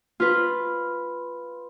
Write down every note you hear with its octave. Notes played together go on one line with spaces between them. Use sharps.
F4 B4